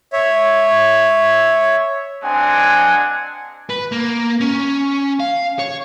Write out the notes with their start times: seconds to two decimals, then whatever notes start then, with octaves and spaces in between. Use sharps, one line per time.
0.13 C#5 E5
2.23 G#3 C4 D4 F#5 G#5
3.69 B4
3.92 A#3
4.41 C#4
5.20 F5
5.59 C#5